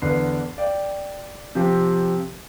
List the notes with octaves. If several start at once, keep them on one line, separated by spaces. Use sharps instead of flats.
E2 D3 B4 C7
D5 G5
C3 F3 C4 G4